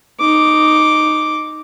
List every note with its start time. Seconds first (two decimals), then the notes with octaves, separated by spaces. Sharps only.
0.20 D#4 D6